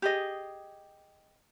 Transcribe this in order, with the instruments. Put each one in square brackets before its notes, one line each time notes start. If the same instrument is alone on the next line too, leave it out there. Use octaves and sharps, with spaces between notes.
[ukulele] G4 G#4 D#5